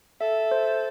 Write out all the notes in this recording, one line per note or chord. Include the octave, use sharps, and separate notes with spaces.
A4 E5
C5